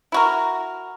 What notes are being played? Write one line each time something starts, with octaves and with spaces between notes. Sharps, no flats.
E4 F#4 A#4